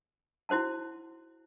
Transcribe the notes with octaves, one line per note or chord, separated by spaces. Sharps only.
E4 F#4 C5 F#5 A5